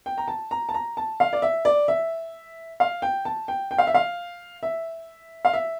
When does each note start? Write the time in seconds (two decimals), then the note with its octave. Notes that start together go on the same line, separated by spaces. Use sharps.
0.06 G5
0.18 A#5
0.28 A5
0.51 A#5
0.69 A5
0.74 A#5
0.97 A5
1.20 F5
1.33 D5
1.42 E5
1.65 D5
1.88 E5
2.80 F5
3.02 G5
3.25 A5
3.48 G5
3.71 G5
3.78 F5
3.87 E5
3.94 F5
4.63 E5
5.45 F5
5.54 E5